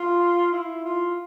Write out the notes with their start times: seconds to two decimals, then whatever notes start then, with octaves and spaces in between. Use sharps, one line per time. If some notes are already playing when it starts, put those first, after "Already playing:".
Already playing: F4
0.51 E4
0.85 F4